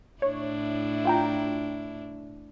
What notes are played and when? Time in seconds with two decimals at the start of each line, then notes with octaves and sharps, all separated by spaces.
0.22 A2 D4 E4 C#5
1.05 F4 G5 A#5